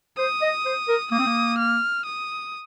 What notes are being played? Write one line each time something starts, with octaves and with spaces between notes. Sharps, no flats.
C5 D#6
D#5
C5
A#4
A#3 D#6
C4
A#3
F6
D#6